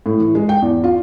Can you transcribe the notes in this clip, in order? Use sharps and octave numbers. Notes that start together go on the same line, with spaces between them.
A2
E3
G#3
G5
E2
F4